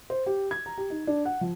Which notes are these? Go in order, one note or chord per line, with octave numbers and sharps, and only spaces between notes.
C5
G4
G#6
A#5
G4
D#4
D4
F#5
F3